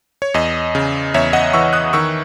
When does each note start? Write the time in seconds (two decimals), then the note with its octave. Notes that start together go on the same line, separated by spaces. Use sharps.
0.22 C#5
0.34 E2 D#5
0.75 C#3
1.14 E2 C#5 E5
1.33 D#5 F#5
1.53 E3 C#6 E6
1.73 D#6 F#6
1.93 D#3 C#6 E6